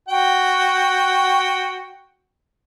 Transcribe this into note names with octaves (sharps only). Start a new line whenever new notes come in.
F#4 G5